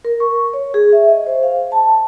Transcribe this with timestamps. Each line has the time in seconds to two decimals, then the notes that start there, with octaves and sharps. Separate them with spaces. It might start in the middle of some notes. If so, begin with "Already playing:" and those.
0.05 A#4
0.20 C#6
0.54 C#5
0.74 G#4
0.93 E5
1.08 D#5
1.27 C5
1.43 F5
1.72 A5